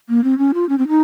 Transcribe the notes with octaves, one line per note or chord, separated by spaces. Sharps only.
A#3
C4
C#4
F4
C#4
C4
D#4